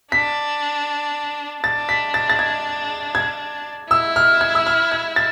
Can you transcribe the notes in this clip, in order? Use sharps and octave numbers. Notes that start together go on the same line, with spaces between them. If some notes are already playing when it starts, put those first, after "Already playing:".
D4 B6
D4 A6
B6
A6
A6
G#6
G#6
E4 E6
F6
G#6
E6
F6
G#6
A6